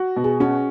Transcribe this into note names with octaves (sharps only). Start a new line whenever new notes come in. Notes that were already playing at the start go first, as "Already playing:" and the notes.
Already playing: F#4
B2
G#4
C#4 F#4